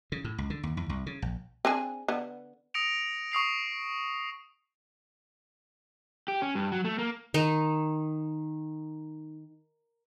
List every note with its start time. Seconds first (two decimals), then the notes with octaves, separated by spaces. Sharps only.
0.12 C#3
0.24 A2
0.38 C#2
0.50 D3
0.63 D#2
0.77 E2
0.89 C2
1.06 C#3
1.22 A#1
1.65 C4 D4 G#4
2.08 D3 B3
2.74 D#6 A#6 C#7 D7 F7
3.32 C#6 D#6 C7 F7
6.28 G4
6.42 C#4
6.55 G2
6.72 F#3
6.85 A3
6.98 A#3
7.34 D#3 D#4